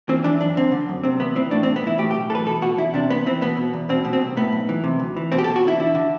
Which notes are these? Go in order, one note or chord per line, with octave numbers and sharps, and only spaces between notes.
E3 C4
E3 D4
F#2 D4
D3 C4
D3
F#2
C3 C4
E2 B3
E3 C4
A2 D4
C4
B1
B3
E3 E4
A2 G4
G4
B1
E3 A4 B4
B2 A4
B2 F#4
E2 E4
C3 D4
E2 B3
E3 C4
B2 B3
B2
E2
B2 C4
B2
C4
C2
A2 B3
B1
E3
C3
D2
E3
B2 C4
G4
A4
B2
F#4
E2 E4
D3 E4
D3